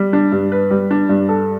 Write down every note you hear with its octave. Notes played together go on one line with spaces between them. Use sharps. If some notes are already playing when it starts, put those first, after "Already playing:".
Already playing: G3
D4
G2
B4
G3
D4
G2
A4